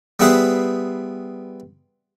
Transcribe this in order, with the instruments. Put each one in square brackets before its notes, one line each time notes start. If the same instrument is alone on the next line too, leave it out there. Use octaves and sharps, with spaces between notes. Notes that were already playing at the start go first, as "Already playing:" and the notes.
[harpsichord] G3 B3 E4 G#4 B4 C5